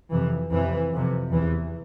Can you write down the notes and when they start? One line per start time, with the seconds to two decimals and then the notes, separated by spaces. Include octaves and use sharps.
0.12 F2 C3 E3
0.52 F2 C3 E3
0.93 F2 C3
1.33 E2 C3 E3